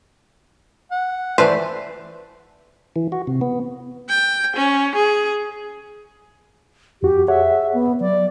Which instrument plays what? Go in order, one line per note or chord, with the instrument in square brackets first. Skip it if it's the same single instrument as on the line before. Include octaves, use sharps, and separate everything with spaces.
[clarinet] F#5
[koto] E3 A3 B4 [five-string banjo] C5 [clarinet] D5
[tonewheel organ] E3
F#4
C3
B3
[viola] G5
C#4
G#4
[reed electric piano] F2 F#4 [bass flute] G4
[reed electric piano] G#4 C#5 F#5 [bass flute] E5
[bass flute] B3
[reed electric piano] F#3 [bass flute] D5